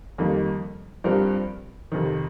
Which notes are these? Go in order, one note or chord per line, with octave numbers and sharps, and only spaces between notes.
F2 D#3 G3 A#3 D#4
G2 F3 C4 G4 A#4
F2 C3 D#3